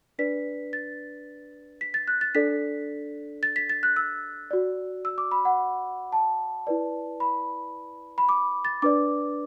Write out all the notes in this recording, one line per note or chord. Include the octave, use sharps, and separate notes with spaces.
D4 B4 D5 B6
A6
B6
A6
F#6
A6
D4 A4 D5 B6
A6
B6
A6
F#6
E6
F#4 D5
E6
D6
B5
F#5
A5
E4 B4 D5
B5
B5
D6
A6
D4 B4 D5 D6